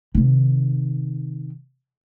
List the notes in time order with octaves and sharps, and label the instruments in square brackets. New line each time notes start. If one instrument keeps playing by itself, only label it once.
[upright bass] C3 D#3